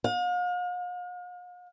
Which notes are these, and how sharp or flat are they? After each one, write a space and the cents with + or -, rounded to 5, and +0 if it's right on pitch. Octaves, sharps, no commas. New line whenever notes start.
F5 +45